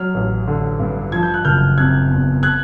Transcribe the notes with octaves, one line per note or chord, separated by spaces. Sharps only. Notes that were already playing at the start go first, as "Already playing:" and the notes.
Already playing: F#3 F6
A1
D3
G2
F3 G#6
G6
F#6
F#1 F6 G6
C3 F#6 G#6
E2
F#6 G#6